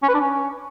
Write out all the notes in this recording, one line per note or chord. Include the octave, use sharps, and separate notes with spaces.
C#4
B4
D4
C#4